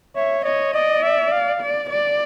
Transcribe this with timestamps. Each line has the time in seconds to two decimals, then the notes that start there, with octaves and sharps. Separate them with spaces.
0.16 C#5 E5
0.44 C#5 D#5
0.73 D5 D#5
1.03 E5
1.32 F5
1.61 D5
1.89 D5